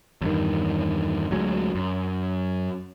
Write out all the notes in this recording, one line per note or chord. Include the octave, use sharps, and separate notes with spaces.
E2 G2 D#3
D2 F#3 G#3
F#2